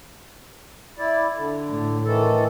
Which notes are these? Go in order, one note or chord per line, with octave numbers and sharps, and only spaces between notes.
E4 D5
D3
A2
D#3 E3 A4